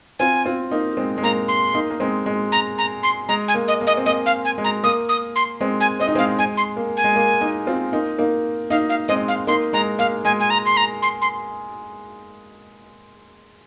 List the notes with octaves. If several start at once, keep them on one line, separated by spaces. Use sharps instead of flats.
C4 F4 G#5
C4 F4
A#3 D#4
G#3 C4
G#3
A#3 A#5
C6
A#3 D#4
A#3
G#3 C4
G#3
A#5
A#5
C6
G#3 A#5
G#5
A#3
D#5
A#3
D#5
C4
A#3 D#5
F5
G#5
G#3
A#5
A#3 D#6
D#6
C6
G#3 C4
G#5
C4 D#5
D#4
G#3 C4 F5
G#3 G#5
C6
A#3
G#5
G#3
A#3
A#3 D#4
C4 F4
A#3 D#4
A#3 D#4
A#3 D#4 F5
F5
G#3 C4 D#5
F5
A#3 D#4 C6
G#3 A#5
A#3 F5
G#3 G#5
G#5
A#5
C6
A#5
C6
C6